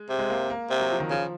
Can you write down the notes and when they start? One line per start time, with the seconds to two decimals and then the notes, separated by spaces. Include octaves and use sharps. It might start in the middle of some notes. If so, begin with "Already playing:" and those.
Already playing: G#3
0.09 C3
0.19 G#3
0.30 A#3
0.50 A#3
0.70 C3
0.80 F#3
0.90 F3
1.00 D#3
1.10 C#3 F3